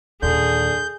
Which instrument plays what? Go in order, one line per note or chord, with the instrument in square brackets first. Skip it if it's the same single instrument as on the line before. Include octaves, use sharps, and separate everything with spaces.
[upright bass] D#2 A#2 [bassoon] D3 [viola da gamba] G#4 [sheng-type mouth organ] G6